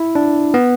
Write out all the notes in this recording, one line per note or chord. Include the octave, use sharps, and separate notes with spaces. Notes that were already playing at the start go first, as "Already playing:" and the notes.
Already playing: E4
D4
B3